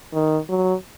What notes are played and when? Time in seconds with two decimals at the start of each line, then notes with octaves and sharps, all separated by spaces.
0.13 D#3
0.49 F#3